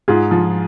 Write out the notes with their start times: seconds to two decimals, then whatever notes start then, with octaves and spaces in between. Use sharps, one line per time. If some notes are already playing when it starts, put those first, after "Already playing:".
0.08 G#2 F4 G#4
0.31 F3